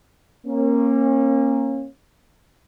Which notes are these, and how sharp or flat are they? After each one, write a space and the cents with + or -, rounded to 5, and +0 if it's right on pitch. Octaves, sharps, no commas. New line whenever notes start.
A#3 +0 C#4 -35